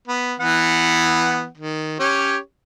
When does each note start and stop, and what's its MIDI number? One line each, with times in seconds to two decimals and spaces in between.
0.08 0.35 59
0.40 1.46 52
0.40 1.46 59
0.40 1.46 78
1.58 1.99 51
2.00 2.38 61
2.00 2.38 67
2.00 2.38 73